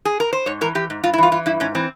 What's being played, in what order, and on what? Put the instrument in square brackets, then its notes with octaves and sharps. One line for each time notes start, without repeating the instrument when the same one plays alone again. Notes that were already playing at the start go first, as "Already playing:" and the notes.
[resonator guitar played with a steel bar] G#4
A#4
C5
G#2 C#5
E3 A#4
E3 G4
G#2
G2 F4
E4
E3 F4
E3 F4
G2 E4
G#2 C#4
E3 C4